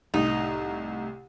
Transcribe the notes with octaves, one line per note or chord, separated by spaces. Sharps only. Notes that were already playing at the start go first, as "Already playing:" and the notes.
C2 A2 D#4